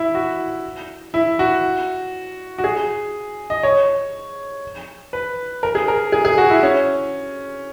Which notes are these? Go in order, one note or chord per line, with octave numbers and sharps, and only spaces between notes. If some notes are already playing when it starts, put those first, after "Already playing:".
Already playing: E4
F#4
E4
F#4
F#4
G#4
D#5
C#5
B4
A#4
G#4
A#4
G#4
G#4
F#4
E4
C#4